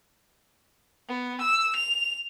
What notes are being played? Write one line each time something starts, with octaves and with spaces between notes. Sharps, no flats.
B3
E6
F7